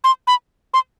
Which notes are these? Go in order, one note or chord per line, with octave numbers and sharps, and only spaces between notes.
C6
B5
C6